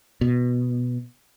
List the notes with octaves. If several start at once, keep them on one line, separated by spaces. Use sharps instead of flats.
B2